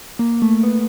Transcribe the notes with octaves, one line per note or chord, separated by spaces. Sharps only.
A#3
A3
B3